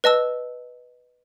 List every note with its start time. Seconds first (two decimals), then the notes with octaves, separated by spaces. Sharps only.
0.04 B4 D#5 A5 E6